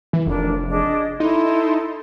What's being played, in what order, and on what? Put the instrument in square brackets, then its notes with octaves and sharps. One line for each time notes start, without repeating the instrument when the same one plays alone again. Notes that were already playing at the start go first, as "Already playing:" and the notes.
[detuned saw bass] E3
[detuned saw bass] F1 [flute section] D4 A#4
[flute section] D4 G#4 D#5
[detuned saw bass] D#4 [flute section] E4 A4 C6